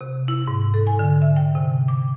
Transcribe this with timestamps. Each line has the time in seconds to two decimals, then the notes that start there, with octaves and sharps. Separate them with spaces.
0.01 C3
0.28 E4
0.47 G#2
0.74 A4
0.87 G#5
0.99 D3
1.22 E5
1.36 G5
1.55 C3
1.88 D6